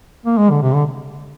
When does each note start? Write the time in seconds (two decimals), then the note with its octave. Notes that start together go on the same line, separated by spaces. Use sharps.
0.26 A#3
0.37 G#3
0.50 D3
0.62 C3
0.74 D3